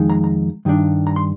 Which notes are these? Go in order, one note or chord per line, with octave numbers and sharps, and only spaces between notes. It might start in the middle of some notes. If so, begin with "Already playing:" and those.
Already playing: F2 D#3 G#3 D#4
A#5
A#5
G2 D#3 G3 D4
A#5
C6